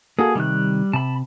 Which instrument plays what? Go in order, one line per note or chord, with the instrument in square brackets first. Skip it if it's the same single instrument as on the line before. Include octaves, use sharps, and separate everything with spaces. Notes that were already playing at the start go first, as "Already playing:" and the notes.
[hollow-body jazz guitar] A#3 F#4 A4 [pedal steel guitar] G#4
[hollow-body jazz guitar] C3 D#3 [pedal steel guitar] G3 F#6
[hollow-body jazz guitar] C3 [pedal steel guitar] A5 B5